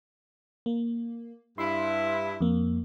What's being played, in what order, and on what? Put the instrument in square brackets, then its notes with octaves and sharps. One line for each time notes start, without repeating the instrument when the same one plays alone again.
[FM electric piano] A#3
[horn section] G2 E4 [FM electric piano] C6
[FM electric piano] F2 A#3